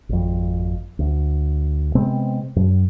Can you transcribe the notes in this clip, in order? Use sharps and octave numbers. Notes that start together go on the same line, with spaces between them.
G#1 F2
D2
C3 G#3 B3 C4
F#2